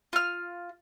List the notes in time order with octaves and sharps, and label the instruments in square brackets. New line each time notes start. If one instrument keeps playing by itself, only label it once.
[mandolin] F4 F6